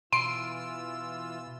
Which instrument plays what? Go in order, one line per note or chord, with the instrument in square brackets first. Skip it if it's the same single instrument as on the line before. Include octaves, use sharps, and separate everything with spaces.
[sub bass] B2 [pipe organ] E3 F4 E6 [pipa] C6 [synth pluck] D7